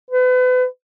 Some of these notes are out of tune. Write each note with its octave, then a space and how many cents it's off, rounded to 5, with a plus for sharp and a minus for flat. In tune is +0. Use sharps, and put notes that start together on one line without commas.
B4 +35